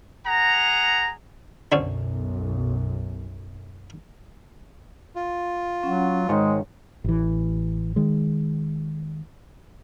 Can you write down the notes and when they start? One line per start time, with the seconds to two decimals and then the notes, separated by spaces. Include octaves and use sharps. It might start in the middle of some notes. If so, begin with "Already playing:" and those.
0.25 G#4 F#5 A#5
1.72 B1 F#2 D3 C4 C#4
5.16 F4
5.83 F#3 C#4 F#5
6.29 G#2 D#3 G#3 C#5
7.04 A1 E3
7.96 D#3 G#3